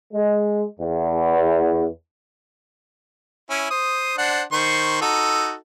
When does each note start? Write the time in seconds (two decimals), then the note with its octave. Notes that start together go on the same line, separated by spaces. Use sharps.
0.13 G#3
0.79 E2
3.50 C#4 E4
3.71 C5 D#6
4.18 D4 C5 F#5
4.52 D#3 C5 C#6
5.01 D#4 F#4 A4